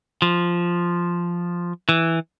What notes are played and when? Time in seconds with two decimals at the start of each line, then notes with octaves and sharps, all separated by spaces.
0.22 F3
1.89 E3